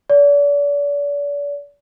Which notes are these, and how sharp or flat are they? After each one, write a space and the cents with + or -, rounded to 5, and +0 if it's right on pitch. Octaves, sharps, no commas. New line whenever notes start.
D5 -40